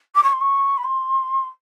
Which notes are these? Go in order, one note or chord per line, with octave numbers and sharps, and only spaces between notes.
D6
C#6
C6
C#6
B5
C6